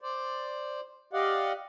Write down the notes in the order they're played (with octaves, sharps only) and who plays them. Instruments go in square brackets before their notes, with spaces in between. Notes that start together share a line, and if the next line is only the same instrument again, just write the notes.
[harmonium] C5 D5
G4 D5 D#5 F5 F#5